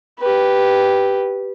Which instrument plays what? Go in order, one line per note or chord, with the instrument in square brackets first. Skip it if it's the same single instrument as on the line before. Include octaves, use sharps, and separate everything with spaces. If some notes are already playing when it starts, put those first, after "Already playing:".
[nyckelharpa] G4 B4